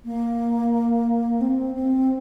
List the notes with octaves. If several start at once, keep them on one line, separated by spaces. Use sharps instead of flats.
A#3
C4
C4